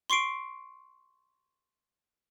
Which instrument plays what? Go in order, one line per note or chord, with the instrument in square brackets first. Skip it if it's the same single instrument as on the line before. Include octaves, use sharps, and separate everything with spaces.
[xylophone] C6 C#6 C7 D7